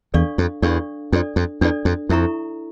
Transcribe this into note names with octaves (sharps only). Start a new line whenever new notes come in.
E2 D4 A4 D5 F5 C#6
F2
E2 D4 A4 D5 F5 C#6
F2 D4 A4 D5
F2
E2 D4 A4 D5
F2
F2 E4 A4 E5 A#5 C#6